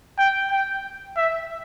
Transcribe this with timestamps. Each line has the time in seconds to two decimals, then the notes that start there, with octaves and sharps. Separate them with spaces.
0.18 G5
0.51 G5
1.17 E5